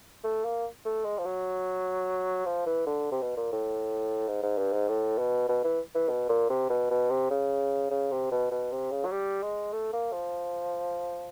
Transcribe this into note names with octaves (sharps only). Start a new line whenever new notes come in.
A3
A#3
A3
G#3
F3
F#3
F3
E3
D3
C3
B2
A#2
A2
G#2
G#2
G2
G#2
A2
B2
B2
E3
E3
B2
A#2
C3
B2
B2
C3
C#3
C#3
C3
B2
B2
C3
C#3
F#3
G3
G#3
A3
A#3
F3